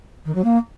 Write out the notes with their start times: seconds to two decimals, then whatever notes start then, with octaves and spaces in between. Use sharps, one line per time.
0.25 D#3
0.34 F#3
0.44 A#3